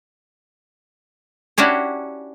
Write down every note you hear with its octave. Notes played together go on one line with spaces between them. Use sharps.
C#4 D4 E4 F#4 G4